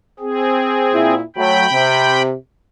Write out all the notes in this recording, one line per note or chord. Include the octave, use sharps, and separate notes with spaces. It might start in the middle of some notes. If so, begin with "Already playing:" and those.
C4 G#4
A#2 E4
F#3 A3 G5 B5
C3